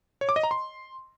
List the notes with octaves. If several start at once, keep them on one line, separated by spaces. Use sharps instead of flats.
C#5
D6
D#5
A#5
C6